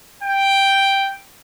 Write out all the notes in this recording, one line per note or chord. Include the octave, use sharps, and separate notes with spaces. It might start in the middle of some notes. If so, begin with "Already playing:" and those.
G5